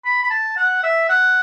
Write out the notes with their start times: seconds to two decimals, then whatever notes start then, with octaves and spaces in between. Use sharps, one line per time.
0.05 B5
0.23 B5
0.31 A5
0.57 F#5
0.83 E5
1.09 F#5